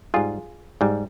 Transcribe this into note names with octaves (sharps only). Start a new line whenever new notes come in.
G#2 G3 F4 G#4
G#2 G3